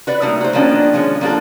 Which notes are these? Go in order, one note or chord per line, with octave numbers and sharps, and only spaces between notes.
F#4 B4 D5
G3 A3 A#3 D#4
F#4 C5
D#3 F3 A#3 B3 C#4 D4
F3 G#3 C#4
F3 A#3 D4 F4 F#4 A4